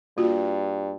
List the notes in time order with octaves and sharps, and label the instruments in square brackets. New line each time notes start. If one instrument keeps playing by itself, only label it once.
[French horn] G2 [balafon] A#3 F4 F#4